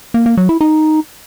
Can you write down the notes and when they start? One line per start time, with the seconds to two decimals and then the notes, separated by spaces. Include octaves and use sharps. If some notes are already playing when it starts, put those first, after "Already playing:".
0.14 A#3
0.26 A#3
0.37 F#3
0.49 E4
0.61 D#4